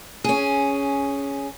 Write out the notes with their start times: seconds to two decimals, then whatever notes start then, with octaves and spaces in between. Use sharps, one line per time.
0.24 C#4 G#4